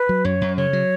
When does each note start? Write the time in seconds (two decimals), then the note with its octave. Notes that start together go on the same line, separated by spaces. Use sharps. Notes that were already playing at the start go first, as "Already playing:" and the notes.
Already playing: B4
0.09 F#3
0.25 F#2 C#5
0.41 F#2
0.57 C#3 C#5
0.73 F#3